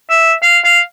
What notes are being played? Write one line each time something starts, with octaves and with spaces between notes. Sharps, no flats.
E5
F5
F5